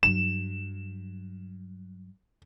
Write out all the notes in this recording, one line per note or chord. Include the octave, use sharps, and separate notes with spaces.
G2 F#3 E7